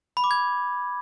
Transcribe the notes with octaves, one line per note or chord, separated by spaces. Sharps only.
B5
D6
G#6